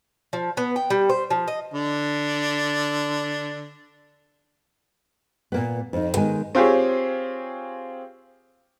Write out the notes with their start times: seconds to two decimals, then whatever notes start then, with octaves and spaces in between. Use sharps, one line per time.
0.33 F3
0.57 B3
0.76 G5
0.90 G3
1.10 C5
1.30 F3
1.48 D#5
1.74 D3 D4
5.52 A#2 A#3 B3
5.93 F2 D#4
6.17 D#3 G#3 B3 G#5
6.55 C4 F4 G4 G#4 C#5